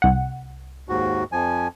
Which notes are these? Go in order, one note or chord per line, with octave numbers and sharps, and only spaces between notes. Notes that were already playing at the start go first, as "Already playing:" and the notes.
C2 F#5
D#2 G#2 F#4
F2 F3 G#5